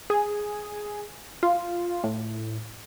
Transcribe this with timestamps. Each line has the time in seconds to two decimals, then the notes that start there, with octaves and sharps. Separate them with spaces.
0.10 G#4
1.43 F4
2.04 A2